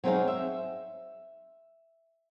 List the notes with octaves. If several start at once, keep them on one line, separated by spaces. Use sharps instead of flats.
F#3 C4 D#4 G#4 C#5 F5
E5